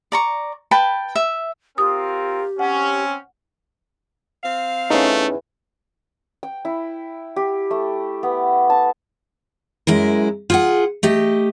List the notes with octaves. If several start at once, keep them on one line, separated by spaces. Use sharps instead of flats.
D5 A#5 C#6
B4 G5 A5 B5
E5
C4 F4 G4 A#4 D#6
C4 C#4 F#5
C4 F5
E2 A3 C#4 D#4
G5
E4
G4
A3
B3
A5
F#2 G#3 E4 A#4
F4 G#4 F#5
A3 G4 D#5